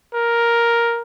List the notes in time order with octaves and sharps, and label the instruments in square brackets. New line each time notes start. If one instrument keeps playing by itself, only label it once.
[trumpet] A#4